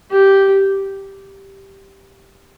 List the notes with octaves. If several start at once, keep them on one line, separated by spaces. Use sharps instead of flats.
G4